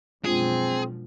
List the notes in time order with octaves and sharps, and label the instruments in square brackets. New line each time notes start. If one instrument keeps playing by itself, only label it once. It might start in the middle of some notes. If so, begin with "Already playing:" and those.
[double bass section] F#2 B2 F3 [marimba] G#3 D4 F4 [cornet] C4 [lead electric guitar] G#4